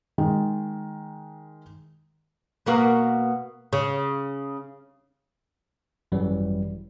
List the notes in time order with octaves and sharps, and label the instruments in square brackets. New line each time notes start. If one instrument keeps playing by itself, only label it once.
[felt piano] D#3 G#3
[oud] B2 A#3 F#4
C#3
[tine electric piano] G#1 F#2 E3 F#3 G3